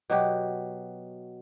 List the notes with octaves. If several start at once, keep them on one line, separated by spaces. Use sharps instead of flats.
B2 F#3 G4